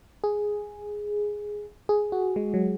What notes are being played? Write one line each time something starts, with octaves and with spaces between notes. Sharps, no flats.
G#4
G#4
F#4
G#3
F#3